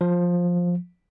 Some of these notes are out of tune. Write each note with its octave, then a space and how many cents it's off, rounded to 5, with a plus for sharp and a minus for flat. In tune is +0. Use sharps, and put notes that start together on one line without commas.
F3 +10